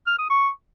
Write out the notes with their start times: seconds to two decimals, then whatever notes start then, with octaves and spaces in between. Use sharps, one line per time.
0.07 F6
0.18 D#6
0.30 C#6